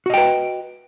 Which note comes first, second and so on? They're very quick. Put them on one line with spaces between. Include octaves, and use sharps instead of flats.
F#4 D#5 G5 B4